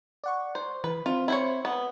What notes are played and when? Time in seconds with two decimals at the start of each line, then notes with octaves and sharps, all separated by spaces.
0.24 D5 F#5 C#6
0.55 C5
0.84 E3 B4
1.06 C4 F4
1.28 E4 C5 C#5
1.65 B3